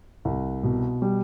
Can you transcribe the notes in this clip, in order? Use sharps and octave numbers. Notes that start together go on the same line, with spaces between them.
C2
B2
G3